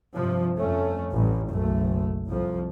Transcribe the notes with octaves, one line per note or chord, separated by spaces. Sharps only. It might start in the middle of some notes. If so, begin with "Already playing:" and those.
G2 C3 F3
F2 A3 C#4
A1 G3
F#1 B1 A3
C2 F2 F3